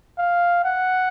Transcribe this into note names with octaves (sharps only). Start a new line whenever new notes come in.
F5
F#5